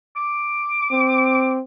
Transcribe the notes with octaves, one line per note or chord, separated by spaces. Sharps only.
D6
C4